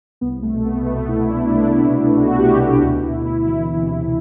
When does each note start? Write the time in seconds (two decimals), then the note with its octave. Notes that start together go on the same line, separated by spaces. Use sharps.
0.21 C2 B3
0.42 A3
0.53 B2
0.65 B3
0.86 C2 A3
1.08 E4
1.18 B2
1.30 D4
1.51 C2 E4
1.83 B2
2.16 C2 F#4
2.38 G4
2.49 B2
2.60 G4
2.81 D2 F#4
3.03 E4
3.13 D2
3.25 E4
3.46 E3
3.78 C3